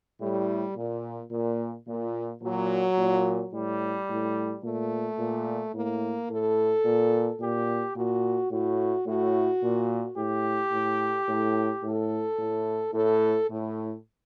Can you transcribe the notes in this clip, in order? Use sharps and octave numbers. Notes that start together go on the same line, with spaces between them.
A2 G3
A#2
A#2
A#2
A#2 F#3
A#2
A2 G3
A2
A#2 A3
A#2
A2 A#3
A2 A4
A#2
A#2 G4
A#2 F#4
A2 F#4
A2 F#4
A#2
A2 G4
A2
A2
A2 A4
A2
A2 A4
A2